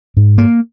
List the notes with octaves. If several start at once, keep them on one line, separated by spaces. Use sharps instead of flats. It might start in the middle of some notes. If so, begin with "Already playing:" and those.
G#2
A#3